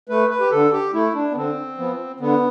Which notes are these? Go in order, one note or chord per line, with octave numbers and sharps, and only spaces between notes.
A3 B4
B4
G4
D3 A4
G4
A3 E4
D4
B3
D3 C4
F3 B3
D3 B3